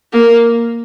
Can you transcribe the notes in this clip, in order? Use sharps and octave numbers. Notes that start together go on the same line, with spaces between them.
A#3